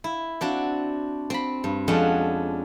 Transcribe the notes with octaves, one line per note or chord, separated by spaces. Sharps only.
E4
C4 D4 F#4
C4 B5
G2
F2 G#3 C#4 D4 F#5 G5